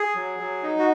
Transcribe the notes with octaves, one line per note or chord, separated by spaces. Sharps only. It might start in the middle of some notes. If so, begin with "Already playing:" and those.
Already playing: G#4
F#3
F#3
D#4
F#4